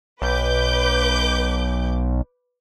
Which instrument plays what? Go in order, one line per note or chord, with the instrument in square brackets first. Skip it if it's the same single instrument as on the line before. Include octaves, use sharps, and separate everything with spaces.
[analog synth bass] B1 [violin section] B4 D6 G6